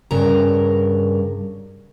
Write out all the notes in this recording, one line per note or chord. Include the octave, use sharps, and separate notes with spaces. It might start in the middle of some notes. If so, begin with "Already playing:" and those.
G2 C#3 A#4 A#5